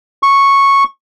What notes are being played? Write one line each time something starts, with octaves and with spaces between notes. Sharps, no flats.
C#6